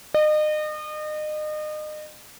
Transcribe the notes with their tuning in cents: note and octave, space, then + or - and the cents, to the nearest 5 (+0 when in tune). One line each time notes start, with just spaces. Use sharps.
D#5 -35